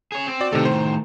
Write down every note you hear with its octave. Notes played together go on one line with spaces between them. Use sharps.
G#4 C#5
C4
F#4 D5
A2 C3 D#3 D#4 A4
C5